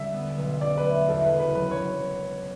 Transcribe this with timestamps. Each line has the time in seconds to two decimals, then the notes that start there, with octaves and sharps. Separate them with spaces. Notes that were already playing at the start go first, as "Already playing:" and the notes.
Already playing: D3 G3 E5
0.14 B3
0.38 B1
0.61 B1 D5
0.78 B4
0.85 A3
1.08 E2 A4
1.25 B4
1.32 F#1
1.40 B4
1.55 F#3 B4
1.71 C#5
1.79 F#3